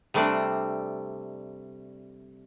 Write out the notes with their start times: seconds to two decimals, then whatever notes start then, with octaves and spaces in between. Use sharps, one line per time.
0.14 C3 G3 A3 C4 D4